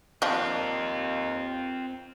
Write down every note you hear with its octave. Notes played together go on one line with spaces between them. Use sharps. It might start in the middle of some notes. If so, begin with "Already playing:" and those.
D#2 F3 C4 D4 F4